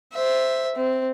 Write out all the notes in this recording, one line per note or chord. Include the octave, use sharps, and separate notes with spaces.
C5 E5
C4